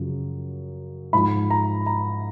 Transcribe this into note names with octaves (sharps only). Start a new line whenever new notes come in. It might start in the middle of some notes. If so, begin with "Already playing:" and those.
Already playing: F#2 C#3 F3
G#2 F3 B5
A#5
A#5